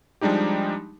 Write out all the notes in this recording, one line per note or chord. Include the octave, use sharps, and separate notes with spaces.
F3 G3 G#3 D4 D#4 G4